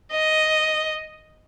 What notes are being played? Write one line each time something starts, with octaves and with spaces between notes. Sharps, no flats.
D#5